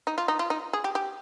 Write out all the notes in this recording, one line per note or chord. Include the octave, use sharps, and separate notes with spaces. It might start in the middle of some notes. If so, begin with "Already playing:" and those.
D#4
F4
D#4
F4
D#4
G#4
G4
G4